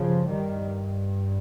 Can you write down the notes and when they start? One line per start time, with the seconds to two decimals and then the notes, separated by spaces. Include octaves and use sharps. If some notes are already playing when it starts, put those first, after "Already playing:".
Already playing: G2 C#3 F3
0.26 D#3 G3